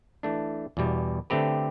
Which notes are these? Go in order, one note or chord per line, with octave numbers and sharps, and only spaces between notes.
E3 A3 D4
E2 B2 G3
D3 A3 C4 G4 B4